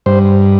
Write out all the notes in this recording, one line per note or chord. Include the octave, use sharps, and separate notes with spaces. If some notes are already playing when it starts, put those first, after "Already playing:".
G2 C5